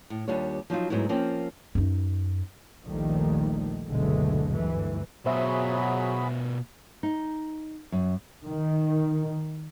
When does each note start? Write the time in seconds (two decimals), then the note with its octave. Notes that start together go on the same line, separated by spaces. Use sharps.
0.10 A2
0.28 D#2 G3 D4 F4 C#5
0.70 F3 F#3 D#4 F4
0.90 G#2 F#3 A3 B3 E4
1.09 F3 A#3 C4 C#4 F4
1.75 F#2 D#4
2.86 A#1 D#2 D#3 F3 G3 A3
3.89 F#1 D2 B2 D3 G#3 A3
4.56 D2 G2 E3
5.26 B2 F#3 F4 F#4 G#4 C5 E5 B5
7.03 D#4
7.92 F#2
8.46 D#3